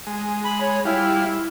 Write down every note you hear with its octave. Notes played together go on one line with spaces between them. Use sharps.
G#3
B5
C#5
G3 E4 F4